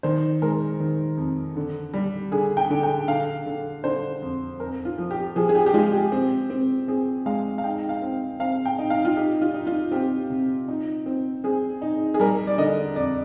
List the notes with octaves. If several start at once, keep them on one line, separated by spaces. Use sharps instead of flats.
D#3 C5
G#3 A#4
D#3
F2
D3
G3
D3 G#4
G5
D3
G5
D3 F5
D3
D3 C5
F2
F2 A#4
F4
F3
G4
F3 G#4
G#4
G4
G4
G#3 F4
G4
C4
C4
C4 G#4
G#3 F5
F5
D#4 G5
F5
C4
C4 F5
G5
D#4
F5
F4
D#4 G4
F4
D#4
F4
C4 G4
C3
D#4
C4
C4 G#4
D#4
G#4
G3 A#4
D5
D3 D#5
F2 D5